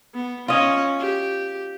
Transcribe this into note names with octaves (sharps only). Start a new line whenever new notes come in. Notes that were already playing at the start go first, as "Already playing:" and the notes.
B3
C#4 F4 D#5
G4